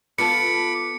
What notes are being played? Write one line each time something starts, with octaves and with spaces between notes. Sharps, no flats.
B3 F4 A4 B5 D6 C#7